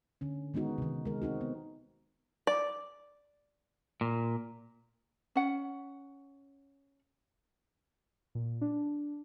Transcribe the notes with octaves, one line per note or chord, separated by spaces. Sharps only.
D3 C#4
D#3 G#3 B3 D#4 F#4
C3 D#3
G#3 A#4
C4 D#4 F#4
B3
D5
A#2
C#4 F#5
A#2
D4